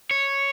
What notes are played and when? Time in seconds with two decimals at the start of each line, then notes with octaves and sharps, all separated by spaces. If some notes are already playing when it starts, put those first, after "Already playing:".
0.11 C#5